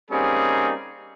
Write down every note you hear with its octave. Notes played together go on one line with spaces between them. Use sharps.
G3 A#3 C4 C#4 D#4 G#4